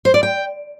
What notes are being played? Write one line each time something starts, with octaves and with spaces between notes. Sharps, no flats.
C5
D5
G5